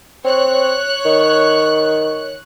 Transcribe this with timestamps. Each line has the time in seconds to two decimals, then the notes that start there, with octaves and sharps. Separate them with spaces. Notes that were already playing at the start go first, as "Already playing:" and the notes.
0.25 C4 C#5 F#6
1.05 D#3